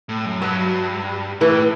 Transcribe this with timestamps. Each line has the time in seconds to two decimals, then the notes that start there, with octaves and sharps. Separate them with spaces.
0.09 A2
0.25 F#2
0.42 G2 F#3
1.40 A2 E3